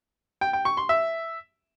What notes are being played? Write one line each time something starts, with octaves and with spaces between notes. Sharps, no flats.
G5
G5
C#6
C6
E5